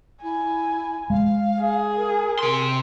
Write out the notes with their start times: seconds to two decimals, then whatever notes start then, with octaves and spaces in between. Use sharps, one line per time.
0.22 E4 G#5
1.10 G#3 F5
1.60 G#4
1.96 A#4
2.39 C3 C6